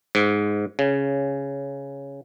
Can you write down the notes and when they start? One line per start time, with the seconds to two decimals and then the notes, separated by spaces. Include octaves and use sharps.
0.15 G#2
0.79 C#3